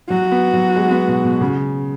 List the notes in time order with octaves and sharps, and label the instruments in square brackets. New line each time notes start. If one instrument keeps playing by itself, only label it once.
[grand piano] F#3 [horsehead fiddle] F#4
[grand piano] B3
F#3
G#3
B3
B2
B2
C#3